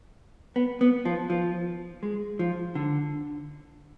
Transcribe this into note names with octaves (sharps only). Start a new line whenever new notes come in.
B3
B3
F3
F3
G#3
F3
D3